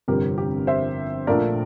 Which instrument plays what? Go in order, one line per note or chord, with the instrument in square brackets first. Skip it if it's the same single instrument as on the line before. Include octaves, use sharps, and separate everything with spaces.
[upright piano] G1 F2 C3 G3 C4 G4 A#4
G4
C5 E5
A#1 A#2 A3 D4 A#4 D5